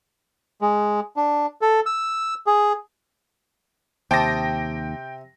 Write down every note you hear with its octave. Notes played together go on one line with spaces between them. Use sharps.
G#3
D4
A4
E6
G#4
D#2 C3 G5 A5 D6 D#6 A#6